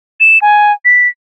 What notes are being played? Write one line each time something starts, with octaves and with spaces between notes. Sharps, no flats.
E7
G#5
B6